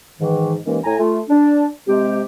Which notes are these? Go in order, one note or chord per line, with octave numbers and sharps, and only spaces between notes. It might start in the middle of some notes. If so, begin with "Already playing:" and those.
G#2 D#3 E3
D#2 D#3 E3 G#3 A#3 C#4
A2 G#5 A#5
A3 F4
D4
C3 G#3 G4